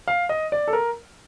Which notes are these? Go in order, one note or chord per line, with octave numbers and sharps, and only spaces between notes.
F5
D#5
D5
A4
A#4